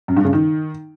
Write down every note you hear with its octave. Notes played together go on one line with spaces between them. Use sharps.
F#2
G2
C#3
D#3